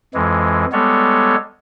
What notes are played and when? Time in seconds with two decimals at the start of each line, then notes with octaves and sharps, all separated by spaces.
0.14 F2 E3 G#3
0.72 G3 G#3 B3 A4 C#5